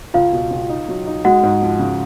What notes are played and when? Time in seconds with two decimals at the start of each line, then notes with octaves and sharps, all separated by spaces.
0.14 C#2 F4 F5
0.33 B2
0.51 C#2
0.69 D#4
0.89 F#3
1.07 D#4
1.25 G#3 F#4 F#5
1.43 G#2
1.62 F3
1.79 C#3